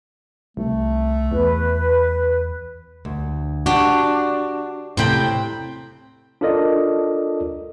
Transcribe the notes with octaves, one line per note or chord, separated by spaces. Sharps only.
C2 A3
E2 B4
D2
D4 F#4 G4
A2 C3 C4 G5 B5
D4 F4 A4 A#4 D5 D#5